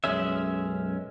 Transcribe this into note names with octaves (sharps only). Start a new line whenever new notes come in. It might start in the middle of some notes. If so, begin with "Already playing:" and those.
B1 F#2 G#3 C#4 E5